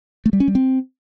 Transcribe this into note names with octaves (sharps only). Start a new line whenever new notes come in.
A3
G3
C#4
G3
C4